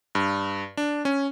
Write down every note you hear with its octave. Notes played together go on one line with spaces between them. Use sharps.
G2
D4
C#4